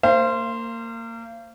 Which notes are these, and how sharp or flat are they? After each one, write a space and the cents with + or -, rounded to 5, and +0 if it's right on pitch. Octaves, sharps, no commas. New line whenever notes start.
A#3 -25 C5 +0 F5 -35